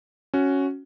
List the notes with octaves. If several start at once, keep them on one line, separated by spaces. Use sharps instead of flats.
C#4 F#4